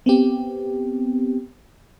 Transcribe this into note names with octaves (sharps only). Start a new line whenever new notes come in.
B3 C4 G4